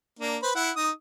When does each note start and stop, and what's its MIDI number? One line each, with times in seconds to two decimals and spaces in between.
0.19 0.37 58
0.19 0.37 62
0.42 0.51 71
0.42 0.51 72
0.42 0.51 83
0.55 0.71 64
0.55 0.71 78
0.76 0.91 63
0.76 0.91 87